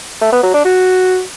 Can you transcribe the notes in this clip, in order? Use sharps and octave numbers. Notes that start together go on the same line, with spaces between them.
A3
B3
F#3
D4
F#4